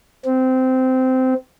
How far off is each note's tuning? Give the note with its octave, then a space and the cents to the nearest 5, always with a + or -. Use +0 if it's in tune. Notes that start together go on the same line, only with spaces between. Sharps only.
C4 -15